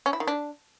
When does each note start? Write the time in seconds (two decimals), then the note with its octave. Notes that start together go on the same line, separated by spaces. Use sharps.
0.06 C#4
0.13 E4
0.20 D#3
0.27 D4